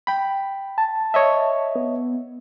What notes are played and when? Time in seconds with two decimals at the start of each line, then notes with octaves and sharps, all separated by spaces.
0.07 G5 B5
0.78 A5
1.14 C#5 D#5 E5
1.75 B3